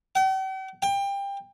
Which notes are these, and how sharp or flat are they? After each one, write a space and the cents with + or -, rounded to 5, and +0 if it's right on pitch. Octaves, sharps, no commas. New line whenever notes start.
G5 -45
G5 +25